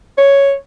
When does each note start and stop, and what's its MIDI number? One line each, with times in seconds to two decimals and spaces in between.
0.18 0.53 73